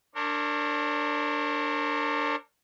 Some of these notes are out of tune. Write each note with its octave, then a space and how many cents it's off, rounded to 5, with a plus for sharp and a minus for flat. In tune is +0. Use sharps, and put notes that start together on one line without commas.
D4 +0 A#4 -25 C#5 -40